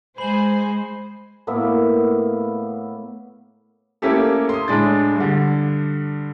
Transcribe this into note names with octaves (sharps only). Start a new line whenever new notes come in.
G#3 C5 G#5 B5 F#7
A2 A#3 B3 E5
A3 A#3 C#4 E4 G4 A4
C6 D#6
A2 G#3 D4 A6
G2 D3